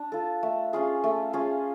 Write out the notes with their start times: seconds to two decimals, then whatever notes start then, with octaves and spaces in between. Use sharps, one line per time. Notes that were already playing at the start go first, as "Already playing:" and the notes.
Already playing: D4
0.12 F4 A4
0.43 A3
0.73 C#4 F4 G#4
1.04 A3
1.33 C#4 F4 G#4